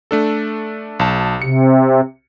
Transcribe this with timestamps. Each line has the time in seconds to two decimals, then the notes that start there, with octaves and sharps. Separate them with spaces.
0.11 A3 D4 A4
0.99 B1 A5
1.42 C3 C#7